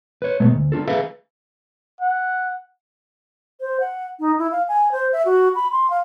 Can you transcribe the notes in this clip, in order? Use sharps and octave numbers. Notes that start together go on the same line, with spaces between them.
B4 C#5
B2 G#3 A3 B3
D2
D4 F4 A4
G#4 A4 B4 E5 F5
F#5
C5
F#5
D#4
E4
F5
G#5
C5
E5
F#4
B5
C6
F5